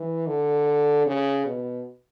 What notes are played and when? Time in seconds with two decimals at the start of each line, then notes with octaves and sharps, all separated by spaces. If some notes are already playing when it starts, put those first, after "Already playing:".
Already playing: E3
0.27 D3
1.07 C#3
1.46 B2